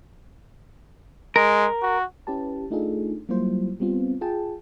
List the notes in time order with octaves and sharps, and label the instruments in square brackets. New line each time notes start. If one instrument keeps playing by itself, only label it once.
[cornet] G#3 [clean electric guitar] A#4
[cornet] F#4
[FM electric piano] C#4 E4 G4 B4 A5
A3 D4 D#4 F4 G#4 A4
F#3 G3 A#3 E4 F4 C5
G3 B3 C4 F4
F4 G#4 G5 A5